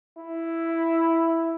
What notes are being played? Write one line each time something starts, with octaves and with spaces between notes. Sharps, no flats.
E4